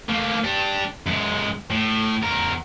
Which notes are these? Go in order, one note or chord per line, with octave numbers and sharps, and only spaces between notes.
A3 A#3
D4 G4
F#2 G#3
A2
E2 A#4